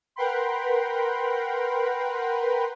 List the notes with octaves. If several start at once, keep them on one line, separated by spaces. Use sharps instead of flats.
A#4 B4 F#5 G5 B5 C6